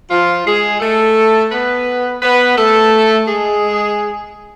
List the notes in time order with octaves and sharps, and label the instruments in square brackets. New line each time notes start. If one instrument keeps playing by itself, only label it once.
[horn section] F3 F4
G#3 G#4
A3 A4
B3 B4
B3 B4
A3 A4
G#3 G#4